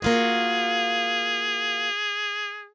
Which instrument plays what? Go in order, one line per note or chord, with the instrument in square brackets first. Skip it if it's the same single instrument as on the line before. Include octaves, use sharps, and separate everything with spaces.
[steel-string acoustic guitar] A#3 F4 F#4 [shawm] G#4